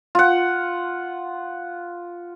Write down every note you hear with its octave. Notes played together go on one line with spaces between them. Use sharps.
F4 F#5